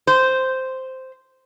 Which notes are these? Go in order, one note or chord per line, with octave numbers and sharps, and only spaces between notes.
C5